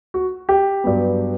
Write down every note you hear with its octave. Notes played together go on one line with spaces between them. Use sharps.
F#4
G4
G2 F#3 B3